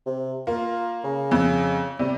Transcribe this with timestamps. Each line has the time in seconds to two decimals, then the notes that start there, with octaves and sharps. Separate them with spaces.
0.06 C3
0.47 A#3 F4
1.04 C#3
1.31 F2
1.99 C3 G3